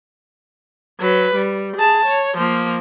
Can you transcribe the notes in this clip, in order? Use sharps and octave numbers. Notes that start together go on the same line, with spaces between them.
F#3 B4
G3
G#4 A5
C#5
F3 A#3